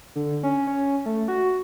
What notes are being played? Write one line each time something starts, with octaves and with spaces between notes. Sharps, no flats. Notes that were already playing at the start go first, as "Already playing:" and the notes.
D3
C#4
C#4
A3
F#4